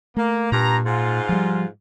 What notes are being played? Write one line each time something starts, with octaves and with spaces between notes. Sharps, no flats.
A3 A#3
G2 A#2 A#5
G#2 F4
F3 G3